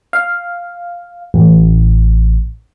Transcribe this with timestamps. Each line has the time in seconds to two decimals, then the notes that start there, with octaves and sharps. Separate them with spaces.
0.13 F5
1.34 A1